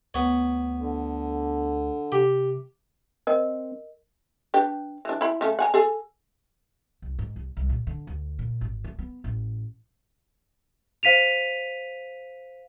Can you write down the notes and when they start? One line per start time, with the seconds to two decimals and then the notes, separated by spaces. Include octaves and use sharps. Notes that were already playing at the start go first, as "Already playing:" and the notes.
0.14 D2 B3 C#5
0.78 D3
2.12 C3 G4
3.27 C4 A#4 D#5
4.54 D4 B4 G5
5.05 E3 D4
5.21 E4 B5
5.41 C#3 A3
5.59 F#5 G#5 A#5
5.74 G#4 A4
7.02 C2
7.19 G#2
7.36 C2
7.57 C2
7.70 A#2
7.87 D3
8.07 D2
8.39 A#2
8.61 G#1
8.84 A3
8.99 B3
9.24 A1
11.03 C5 F5 B6 D#7 F7